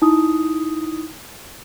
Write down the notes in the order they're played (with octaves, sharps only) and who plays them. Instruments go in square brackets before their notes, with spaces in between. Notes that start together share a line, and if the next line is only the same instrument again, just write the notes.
[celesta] D#4 E4 D#6